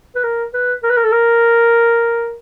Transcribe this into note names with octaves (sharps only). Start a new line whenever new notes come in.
B4
A#4
B4
A#4
B4
A#4
A4
A#4